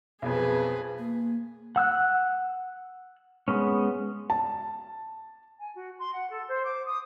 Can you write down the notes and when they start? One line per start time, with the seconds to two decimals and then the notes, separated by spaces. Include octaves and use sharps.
0.22 B1 F2 G#4 B4
0.99 A#3
1.76 F#5 E6 F#6
3.48 G#3 B3 C#4
4.30 A5
5.59 G#5
5.76 F#4
6.00 C6
6.12 F#5
6.31 A4
6.49 C5
6.64 D6
6.86 D#6